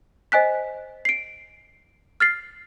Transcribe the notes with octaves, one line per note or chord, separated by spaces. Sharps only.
C5 D#5 G#5 F#6 B6
C7 D7
F6 A6 C7